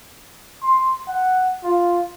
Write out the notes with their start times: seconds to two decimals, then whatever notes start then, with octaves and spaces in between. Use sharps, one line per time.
0.63 C6
1.08 F#5
1.64 F4